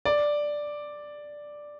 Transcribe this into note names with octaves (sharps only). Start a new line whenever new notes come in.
D5